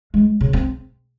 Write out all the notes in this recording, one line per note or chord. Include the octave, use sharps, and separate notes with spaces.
G#3
C#3
C4